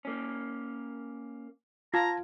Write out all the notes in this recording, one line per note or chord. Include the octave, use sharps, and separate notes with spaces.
A#3 C#4
F4 A5 A#5 G#6